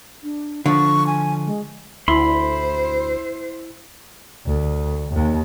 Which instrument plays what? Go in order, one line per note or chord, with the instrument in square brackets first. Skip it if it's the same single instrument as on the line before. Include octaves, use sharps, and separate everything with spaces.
[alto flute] D4
[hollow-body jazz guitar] D3 F3 [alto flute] C#6
[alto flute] G#5
G#3
[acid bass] D2 [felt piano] E4 [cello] C5 [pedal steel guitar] B5 C6
[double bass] D2
D#2